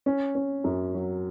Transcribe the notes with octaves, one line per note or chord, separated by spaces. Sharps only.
C#4
C#4
F#2
F#3